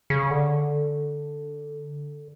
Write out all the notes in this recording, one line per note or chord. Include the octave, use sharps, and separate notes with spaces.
C#3
D3